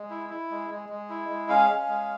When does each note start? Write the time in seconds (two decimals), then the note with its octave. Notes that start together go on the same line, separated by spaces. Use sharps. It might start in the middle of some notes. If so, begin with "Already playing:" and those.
Already playing: G#3
0.10 E4
0.29 E4
0.50 G#3
0.70 G#3
0.89 G#3
1.10 E4
1.29 G#3
1.49 C#4 F5
1.69 C#4
1.88 G#3